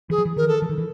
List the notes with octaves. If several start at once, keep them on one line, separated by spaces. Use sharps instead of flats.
E3 G#4
F3
E3
D#3 A#4
A4
E3
D#3
E3